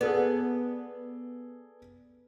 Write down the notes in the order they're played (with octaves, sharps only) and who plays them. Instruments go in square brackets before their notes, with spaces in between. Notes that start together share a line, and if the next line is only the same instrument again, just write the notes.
[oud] B3 [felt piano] G#4 A4 D5